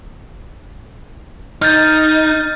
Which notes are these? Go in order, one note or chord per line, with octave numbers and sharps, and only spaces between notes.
D#4 F6 G6 A6